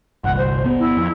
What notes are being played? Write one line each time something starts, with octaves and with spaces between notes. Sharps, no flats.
G1 C2 F#5
C5
G1 B3
E4
F2